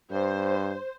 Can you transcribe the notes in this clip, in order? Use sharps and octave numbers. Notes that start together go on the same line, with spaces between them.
G2 C5